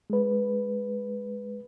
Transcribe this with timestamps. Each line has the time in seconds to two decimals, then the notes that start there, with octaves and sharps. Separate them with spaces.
0.10 G#3 B4